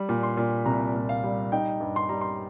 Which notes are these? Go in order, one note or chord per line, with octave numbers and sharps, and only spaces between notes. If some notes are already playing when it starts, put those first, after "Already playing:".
Already playing: G3
A#2
C6
A#2
C2 A#5
A#2
F5
G3
D#4 G5
G2
C6
G3 A#5
C6